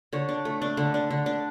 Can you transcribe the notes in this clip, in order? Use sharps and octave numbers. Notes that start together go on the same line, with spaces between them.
D3 C#5
D4
A3
D4
D3
D4
D3
D4